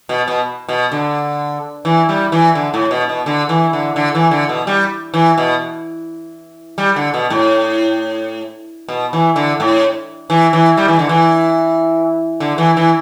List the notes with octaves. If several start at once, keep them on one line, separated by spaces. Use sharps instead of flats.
B2
B2
B2
D3
E3
G3
E3
D3
A2
B2
B2
D3
E3
D3
D3
E3
D3
B2
G3
E3
B2
G3
D3
B2
A2
B2
E3
D3
A2
E3
E3
G3
E3
D3
E3
D3
E3
E3